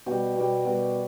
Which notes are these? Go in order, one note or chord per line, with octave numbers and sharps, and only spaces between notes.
B2 G3 G5
B2 G3
B2 G3